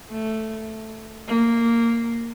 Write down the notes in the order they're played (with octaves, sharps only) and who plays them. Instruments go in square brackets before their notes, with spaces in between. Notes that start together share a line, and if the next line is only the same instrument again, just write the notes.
[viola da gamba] A3
A#3